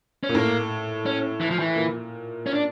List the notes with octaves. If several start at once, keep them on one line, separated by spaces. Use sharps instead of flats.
C#4
A#2
A2 A#3
C#4
E3
F3
E3
A#2
C#4
D4